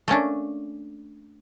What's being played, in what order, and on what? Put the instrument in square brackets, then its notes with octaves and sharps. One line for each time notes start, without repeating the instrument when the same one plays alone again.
[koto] A3 A#3 C#4 D4